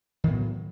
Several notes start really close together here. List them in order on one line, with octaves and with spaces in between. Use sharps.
D#3 A2 B3 F#3